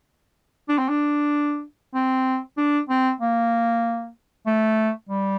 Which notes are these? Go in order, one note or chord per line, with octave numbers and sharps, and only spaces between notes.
D4
C4
D4
C4
D4
C4
A#3
A3
G3